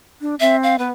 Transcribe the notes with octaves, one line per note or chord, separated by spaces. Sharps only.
D4
C4 E5
F5
B3 B4